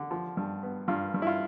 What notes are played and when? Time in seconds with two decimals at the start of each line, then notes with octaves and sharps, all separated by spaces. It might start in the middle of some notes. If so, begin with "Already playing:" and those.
Already playing: D3
0.11 F3
0.37 G2
0.63 B3
0.88 G2 F4
1.14 G2
1.22 E4
1.27 F4